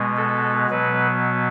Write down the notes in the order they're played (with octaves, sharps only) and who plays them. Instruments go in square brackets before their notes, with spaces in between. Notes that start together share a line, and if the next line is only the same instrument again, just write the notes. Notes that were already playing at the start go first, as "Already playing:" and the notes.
Already playing: [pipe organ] B2 G#3 B3
A4
B2 F#3 B3 B4